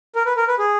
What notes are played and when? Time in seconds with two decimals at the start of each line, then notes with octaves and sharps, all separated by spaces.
0.15 A#4
0.26 B4
0.37 A#4
0.48 B4
0.59 G#4